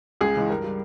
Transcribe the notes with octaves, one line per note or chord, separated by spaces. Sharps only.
C#2 G#4
C#3 E3 G#3
G2 A#4
G3